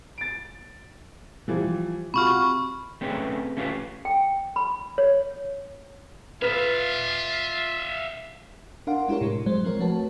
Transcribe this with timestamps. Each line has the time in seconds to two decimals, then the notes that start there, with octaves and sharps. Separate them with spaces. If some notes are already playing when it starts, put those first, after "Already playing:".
0.18 A6 D7
1.48 E3 F3 G3
2.14 C3 F4 F#4 B5 C#6 F6
3.01 A3 C4 C#4 G#4 B4
3.57 A3 C#4 F4 G4 A4 B4
4.05 G5
4.56 B5
4.98 C#5
6.42 F4 B4 E5 F5 F6 B6
8.87 D4 A#4 D5 F5 F#5 C6
9.08 G#3 D4 E4 G4 A#4 C#5
9.21 A2 C3 G#3
9.46 F#3 G#3 C5
9.65 F3 C4 A#4 C#5
9.80 A3 F#4 B4 C#5 A5